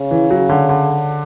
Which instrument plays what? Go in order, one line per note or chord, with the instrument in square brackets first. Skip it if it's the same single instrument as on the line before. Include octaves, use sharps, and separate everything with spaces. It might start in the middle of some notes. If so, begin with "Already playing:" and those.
Already playing: [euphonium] C#3
[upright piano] E3
F#3
D3
D3